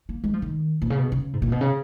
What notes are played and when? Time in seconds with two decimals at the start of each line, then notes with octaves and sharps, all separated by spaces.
0.09 A#3
0.24 G#3
0.33 F3
0.42 D#3
0.82 A#2
0.90 C#3
0.97 B2
1.12 C#3
1.33 G#2
1.42 A#2
1.52 B2
1.61 C#3